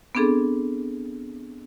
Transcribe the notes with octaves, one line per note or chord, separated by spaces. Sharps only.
B3 C4 D4 G#4 A4